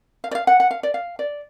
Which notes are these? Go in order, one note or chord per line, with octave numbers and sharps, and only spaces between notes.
F5
D5
F5
F#5
F#5
F5
D5
F5
D5